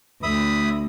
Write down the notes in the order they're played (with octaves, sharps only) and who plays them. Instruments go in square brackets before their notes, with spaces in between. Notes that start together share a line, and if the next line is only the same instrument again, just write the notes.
[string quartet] D2 [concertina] E5 B5 D#6